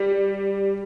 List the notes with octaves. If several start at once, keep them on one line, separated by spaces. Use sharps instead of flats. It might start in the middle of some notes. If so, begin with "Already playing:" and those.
Already playing: G3